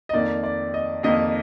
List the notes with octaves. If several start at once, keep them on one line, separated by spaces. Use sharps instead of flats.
D#5
F2 D#3 A#3 D#4 D5
D5
D#5
F2 D#3 A#3 D#4 D#5